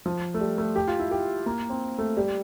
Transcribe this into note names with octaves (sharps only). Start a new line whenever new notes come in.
F3
A3
G3
A3
G4
F4
E4
G4
A#3
C4
A3
G3